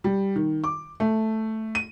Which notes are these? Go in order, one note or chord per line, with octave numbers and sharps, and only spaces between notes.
G3
D#3
D6
A3
D#7